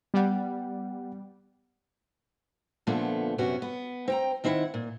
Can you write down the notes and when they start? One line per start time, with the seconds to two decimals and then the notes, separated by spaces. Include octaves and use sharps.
0.14 G3 B3 F#5
2.87 A#2 D3 F3 A3 B3
3.38 F#2 C3 B3 C#4 F#4
3.62 B3
4.08 C4 G5 A#5
4.44 D#3 C4 E4 E5 F#5
4.74 A#2